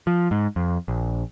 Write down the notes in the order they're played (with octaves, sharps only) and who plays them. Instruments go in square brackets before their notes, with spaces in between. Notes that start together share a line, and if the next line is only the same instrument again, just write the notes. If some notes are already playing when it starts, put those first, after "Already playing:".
[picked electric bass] F3
G#2
F2
A#1